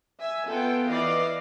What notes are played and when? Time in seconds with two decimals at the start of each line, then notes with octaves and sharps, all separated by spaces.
0.19 E5 G#5
0.50 B3 F4 A4 G5
0.88 E3 D5 D#5 F5